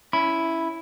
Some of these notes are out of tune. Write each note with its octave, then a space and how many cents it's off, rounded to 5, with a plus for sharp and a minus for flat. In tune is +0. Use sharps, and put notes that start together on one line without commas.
C#4 +15 E4 +0 B5 +0